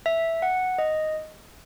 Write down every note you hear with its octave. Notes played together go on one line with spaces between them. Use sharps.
E5
F#5
D#5